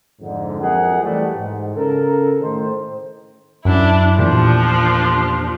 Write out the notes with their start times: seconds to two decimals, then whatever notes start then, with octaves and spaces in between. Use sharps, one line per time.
0.21 F2 G#2 D3
0.61 F2 F#3 G#4 A#4 D#5 F#5
1.02 C2 E3 A3 G4 D5 F#5
1.36 G#2
1.76 C#3 A4 A#4
2.40 A2 D#3 D#4 C5
3.65 F#2 D4 E4
4.18 E2 A#2 F3 D4 G4